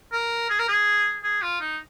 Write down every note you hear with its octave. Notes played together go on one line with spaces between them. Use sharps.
A#4
G#4
A#4
G#4
G#4
F4
D#4